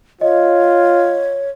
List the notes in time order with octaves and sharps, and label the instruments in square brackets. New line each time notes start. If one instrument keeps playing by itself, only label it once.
[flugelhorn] F4 [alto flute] C#5 [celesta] D#5